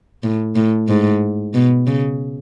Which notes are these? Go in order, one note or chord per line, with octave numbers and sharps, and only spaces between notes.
A2
A2
G#2
B2
C#3